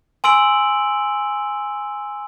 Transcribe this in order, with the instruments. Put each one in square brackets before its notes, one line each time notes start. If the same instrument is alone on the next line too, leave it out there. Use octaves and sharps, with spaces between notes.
[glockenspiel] G#5 C6 E6 D7 F#7